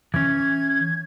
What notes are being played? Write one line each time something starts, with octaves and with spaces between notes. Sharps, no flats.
E3 C#4 G#6